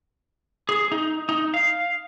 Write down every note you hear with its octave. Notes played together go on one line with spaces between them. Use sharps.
G#4
D#4
D#4
F5